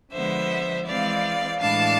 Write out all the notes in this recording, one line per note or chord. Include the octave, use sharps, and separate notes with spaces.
D3 F3 G#3 B3 C5 E5
E3 G#3 C4 D5 F5
A2 E3 G#3 D4 F5 A5